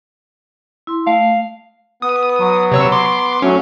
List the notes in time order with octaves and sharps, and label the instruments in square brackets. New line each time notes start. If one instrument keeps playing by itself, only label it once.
[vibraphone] E4 C6
[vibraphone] A3 [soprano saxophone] F5
[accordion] B3 [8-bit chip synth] D#6
[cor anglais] F#3
[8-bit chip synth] C3 C#5 E6
C6 D6
[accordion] F#3 A3 [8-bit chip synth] C#4